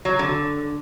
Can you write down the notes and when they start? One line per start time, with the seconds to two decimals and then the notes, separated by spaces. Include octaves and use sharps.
0.05 F#3
0.19 D3